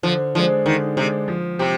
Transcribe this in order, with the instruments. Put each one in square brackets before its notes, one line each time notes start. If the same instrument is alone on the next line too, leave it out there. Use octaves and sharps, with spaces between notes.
[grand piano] D3 [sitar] F3
[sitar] F3 [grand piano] G#3 D4
[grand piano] D3 [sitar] D#3
[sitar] C3 [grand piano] G#3 D4
[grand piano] F3
[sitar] C3 [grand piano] C4 G4